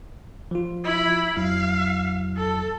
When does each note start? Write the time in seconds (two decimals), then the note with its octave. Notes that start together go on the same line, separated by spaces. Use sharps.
0.51 F3 F4
0.84 E4 B5
1.37 F2 F#3 E4 F5
2.36 A4